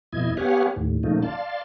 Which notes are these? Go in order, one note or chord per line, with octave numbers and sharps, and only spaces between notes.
F2 B2 E4 D#5 G#6
B3 G4 C#5 F5 F#5 G#5
D#2 A2
A#2 C#3 F3 A3 D#4
D5 F5 A5 C6